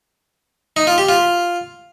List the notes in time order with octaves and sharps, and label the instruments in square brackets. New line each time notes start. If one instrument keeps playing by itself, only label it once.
[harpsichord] D#4
F4
G4
F4